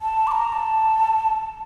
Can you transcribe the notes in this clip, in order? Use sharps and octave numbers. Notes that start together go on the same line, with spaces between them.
A5
D6
A#5
A5